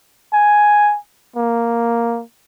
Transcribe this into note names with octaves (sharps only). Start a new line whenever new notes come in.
G#5
A#3